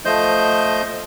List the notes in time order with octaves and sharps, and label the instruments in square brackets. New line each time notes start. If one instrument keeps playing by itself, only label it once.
[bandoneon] F3 A3 C5 D#5 G6